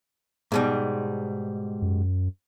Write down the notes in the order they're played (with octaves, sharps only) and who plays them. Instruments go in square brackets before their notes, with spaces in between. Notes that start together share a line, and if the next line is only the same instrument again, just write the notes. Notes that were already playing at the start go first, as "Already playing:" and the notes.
[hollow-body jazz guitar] G#2 B2 G3
[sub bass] F#2